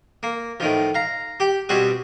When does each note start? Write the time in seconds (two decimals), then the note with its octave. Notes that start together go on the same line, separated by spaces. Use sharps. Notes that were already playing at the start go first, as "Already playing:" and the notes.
0.23 A#3
0.60 A2 D#3 F3
0.95 F5 A#5
1.40 G4
1.69 B2 G3 C4 F#4 G#4